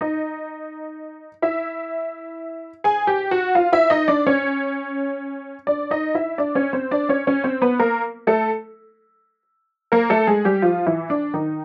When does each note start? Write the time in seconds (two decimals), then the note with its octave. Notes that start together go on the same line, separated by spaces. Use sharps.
0.01 D#4 D#5
1.42 E4 E5
2.84 G#4 G#5
3.07 G4 G5
3.31 F#4 F#5
3.55 F4 F5
3.72 E4 E5
3.90 D#4 D#5
4.08 D4 D5
4.27 C#4 C#5
5.67 D4 D5
5.91 D#4 D#5
6.15 E4 E5
6.38 D4 D5
6.55 C#4 C#5
6.73 C4 C5
6.91 D4 D5
7.09 C#4 C#5
7.27 C#4 C#5
7.44 C4 C5
7.62 B3 B4
7.80 A#3 A#4
8.27 A3 A4
9.92 A#3 A#4
10.10 A3 A4
10.27 G#3 G#4
10.45 G3 G4
10.62 F3 F4
10.86 E3 E4
11.10 D4
11.34 D#3 D#4